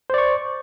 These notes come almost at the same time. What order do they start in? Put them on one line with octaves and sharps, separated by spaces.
C5 D5 C#6